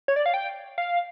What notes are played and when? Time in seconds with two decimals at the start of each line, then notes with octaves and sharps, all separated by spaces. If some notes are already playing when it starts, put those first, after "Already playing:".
0.08 C#5
0.16 D5
0.26 F5
0.34 G5
0.78 F5